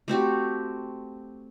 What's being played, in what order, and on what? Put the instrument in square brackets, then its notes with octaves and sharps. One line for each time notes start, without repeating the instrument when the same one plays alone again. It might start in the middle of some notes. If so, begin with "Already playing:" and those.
[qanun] A3 C4 F#4 G4